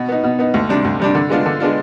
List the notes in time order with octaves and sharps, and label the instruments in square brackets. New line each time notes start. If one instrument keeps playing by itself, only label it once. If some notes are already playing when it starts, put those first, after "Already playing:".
Already playing: [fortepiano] B2
B3 D#4
B2
B3 D#4
D2
C3 G3 D4
D2
C3 G3 D4
D3
G#3 B3 D4 F4
D3
G#3 B3 D4 F4